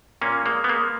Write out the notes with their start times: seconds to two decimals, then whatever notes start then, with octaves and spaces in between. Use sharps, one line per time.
0.21 A#2 A#3 C#4
0.46 G#3 A#3
0.64 B3
0.69 G#3 A#3